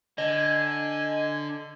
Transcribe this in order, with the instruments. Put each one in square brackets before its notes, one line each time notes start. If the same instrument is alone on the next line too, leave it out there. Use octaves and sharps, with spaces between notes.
[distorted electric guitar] D3 [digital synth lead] D#5 [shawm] G#5